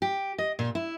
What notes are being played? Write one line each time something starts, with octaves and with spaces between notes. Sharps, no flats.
G4
D#5
A#2
E4